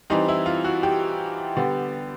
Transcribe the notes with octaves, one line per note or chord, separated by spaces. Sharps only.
E3 G3 C4 D#4
E4
F4
F#4
G4
D3 G3 B3